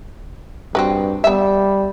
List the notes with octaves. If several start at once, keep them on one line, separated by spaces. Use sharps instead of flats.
G2 C4 F#4 B4
G3 B3 E5